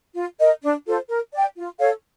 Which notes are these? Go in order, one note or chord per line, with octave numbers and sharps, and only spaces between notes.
F4
A#4 D#5
D4
F4 A4 C5
A#4
D5 G5
F4
A4 C#5 F5